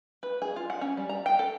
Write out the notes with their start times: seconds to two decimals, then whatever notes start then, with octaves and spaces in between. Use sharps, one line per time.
0.23 B4
0.42 G#4
0.56 F4
0.70 F#5
0.81 C#4
0.97 G3
1.09 A#5
1.26 G5
1.39 A4